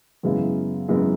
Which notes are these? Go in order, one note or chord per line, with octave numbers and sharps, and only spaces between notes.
F#2 C#3 G#3 B3 E4
F#2 C#3 G#3 B3 E4